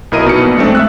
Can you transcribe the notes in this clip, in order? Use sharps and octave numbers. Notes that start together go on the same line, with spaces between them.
B1 B2 E4 A#4 D#5 D#7
B2 D#4 C#7
A#1
G#3 A3 C4 D4
E5 E6 F#6